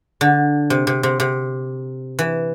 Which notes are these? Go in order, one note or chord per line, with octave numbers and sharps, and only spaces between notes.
D3
C3
C3
C3
C3
E3